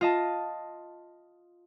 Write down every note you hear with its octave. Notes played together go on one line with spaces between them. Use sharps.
F4 D#5 A5